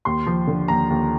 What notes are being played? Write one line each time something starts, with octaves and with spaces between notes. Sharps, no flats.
D#2 C6
F3
D3
D#2 A#5
D#2